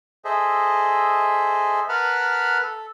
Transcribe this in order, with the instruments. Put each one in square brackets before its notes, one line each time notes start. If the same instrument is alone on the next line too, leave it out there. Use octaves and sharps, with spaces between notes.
[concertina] G#4 A4 C5 D#5 E5
A#4 B4 F#5 A5 B5 F6
A4